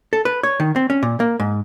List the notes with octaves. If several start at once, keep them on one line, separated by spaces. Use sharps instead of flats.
A4
B4
C#5
D#3
C4
C#4
A#2
A#3
G#2